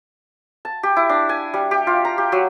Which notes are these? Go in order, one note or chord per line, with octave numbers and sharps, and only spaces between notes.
A5
G4
E4
D4
G#5
G3
G4
F4
A#5
G4
F#3